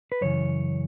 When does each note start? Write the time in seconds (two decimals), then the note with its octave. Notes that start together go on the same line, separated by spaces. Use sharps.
0.12 B4
0.21 F#2 C#3 E3 C#5